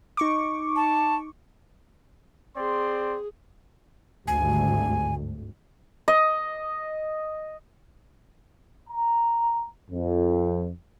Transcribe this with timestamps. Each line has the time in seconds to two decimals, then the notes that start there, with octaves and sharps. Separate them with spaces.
0.17 D#4 C#6 D6
0.76 A5
2.57 C4 G#4 D5 C6
4.27 G#1 D2 G2 G#5
6.08 D#5
8.89 A#5
9.91 F2